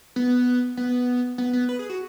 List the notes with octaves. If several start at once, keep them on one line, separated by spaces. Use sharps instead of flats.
B3
B3
B3
B3
B4
G#4
F#4